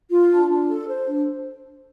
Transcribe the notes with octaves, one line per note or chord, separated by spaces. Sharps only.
F4
D4
D4
A4
C5
D4